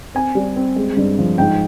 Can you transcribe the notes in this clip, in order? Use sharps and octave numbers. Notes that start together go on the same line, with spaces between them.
C4 G#5
G3
C4
G#3
G2
F3
G#2 G5